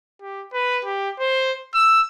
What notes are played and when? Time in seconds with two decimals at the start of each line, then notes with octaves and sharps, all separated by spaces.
0.22 G4
0.53 B4
0.85 G4
1.20 C5
1.75 E6